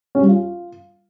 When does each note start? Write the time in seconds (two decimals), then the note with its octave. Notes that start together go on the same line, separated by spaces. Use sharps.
0.15 C#4
0.22 G3
0.28 F4